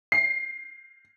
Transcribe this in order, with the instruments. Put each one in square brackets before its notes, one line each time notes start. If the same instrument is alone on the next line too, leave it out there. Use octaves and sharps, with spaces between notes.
[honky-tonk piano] C7